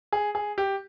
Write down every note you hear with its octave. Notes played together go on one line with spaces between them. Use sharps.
G#4
G#4
G4